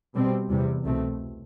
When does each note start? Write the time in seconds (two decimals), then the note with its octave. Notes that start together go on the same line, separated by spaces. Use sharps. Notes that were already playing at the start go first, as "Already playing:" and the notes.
0.15 B2 G3 C4
0.49 E2 C3 G3
0.85 C2 B2 A3 C4